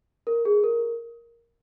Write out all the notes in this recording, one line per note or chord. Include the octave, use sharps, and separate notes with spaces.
A#4
G#4
A#4